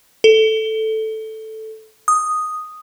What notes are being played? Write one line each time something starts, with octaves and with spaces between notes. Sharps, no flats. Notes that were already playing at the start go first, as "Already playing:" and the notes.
A4
D#6